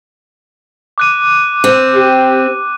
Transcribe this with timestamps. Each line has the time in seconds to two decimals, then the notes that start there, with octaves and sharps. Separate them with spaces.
0.98 D6 F#6 D#7
1.64 C4
1.95 G4